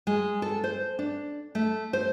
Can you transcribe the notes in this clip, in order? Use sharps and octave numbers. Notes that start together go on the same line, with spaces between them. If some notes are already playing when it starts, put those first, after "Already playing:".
G#3
A4
C5
D4
A3
C5